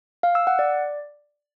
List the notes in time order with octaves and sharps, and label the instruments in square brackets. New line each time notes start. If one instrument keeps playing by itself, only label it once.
[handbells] F5
E6
F#5
D5